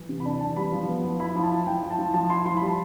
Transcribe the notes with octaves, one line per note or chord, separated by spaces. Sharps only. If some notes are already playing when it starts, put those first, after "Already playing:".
Already playing: E3
C3
B5
D4 A5
E3 A5
G3 B5
F3
B3
F3
E4 B5
F3 B5
A5
E4
F3 G5
E4
A5
F3
F3 A5
E4 C6
F3 C6
G3 B5
A5